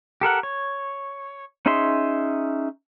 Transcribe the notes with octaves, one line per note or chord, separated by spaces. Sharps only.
G4 A4 A#4 F#5
C#5
C#4 D#4 G#4 E5 C6